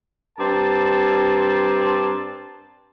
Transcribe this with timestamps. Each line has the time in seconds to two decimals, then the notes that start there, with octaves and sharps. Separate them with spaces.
0.38 G2 C4 A#4 D5 A5